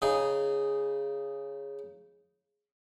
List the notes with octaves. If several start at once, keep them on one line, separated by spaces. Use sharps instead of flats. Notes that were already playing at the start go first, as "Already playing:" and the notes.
C#3 D#4 G#4